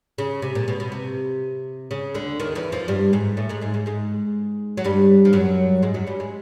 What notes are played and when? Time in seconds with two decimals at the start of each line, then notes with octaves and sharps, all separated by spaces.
0.18 C#3
0.42 C3
0.55 A#2
0.68 B2
0.80 B2
0.92 C3
1.91 C#3
2.14 D2 D3
2.40 D#2 D#3
2.55 E2 E3
2.72 F2 F3
2.88 G2 G3
3.13 G#2 G#3
3.37 A2 A3
3.49 G#2 G#3
3.61 G#2 G#3
3.74 G#2 G#3
3.86 G#2 G#3
4.77 F#3
4.84 G2 G3
5.25 F3
5.33 F#2 F#3
5.83 G#2 G#3
5.94 F#2 F#3
6.07 G2 G3
6.20 G#3